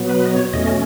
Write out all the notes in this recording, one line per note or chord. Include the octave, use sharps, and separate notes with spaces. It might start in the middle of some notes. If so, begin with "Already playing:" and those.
Already playing: B2 F#3 B3
B4
D#5
C#5
E2 B2 A3 C#4 D#5